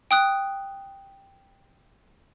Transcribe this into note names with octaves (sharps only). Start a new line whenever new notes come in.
G5 D#6 F#6